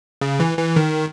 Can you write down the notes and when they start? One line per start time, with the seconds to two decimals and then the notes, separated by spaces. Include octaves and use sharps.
0.21 C#3
0.40 E3
0.58 E3
0.76 D#3